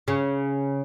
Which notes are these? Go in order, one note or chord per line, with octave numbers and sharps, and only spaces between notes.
C#3